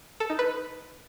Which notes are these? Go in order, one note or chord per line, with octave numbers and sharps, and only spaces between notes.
A4
D#4
B4